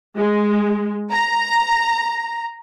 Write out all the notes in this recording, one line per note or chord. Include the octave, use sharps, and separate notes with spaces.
G#3
A#5